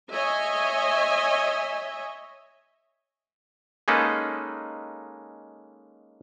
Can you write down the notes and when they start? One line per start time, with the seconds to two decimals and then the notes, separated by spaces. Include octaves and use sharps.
0.11 C#5 D#5 E5 G#5
3.88 G#3 A#3 C#4 D#4 A4 B4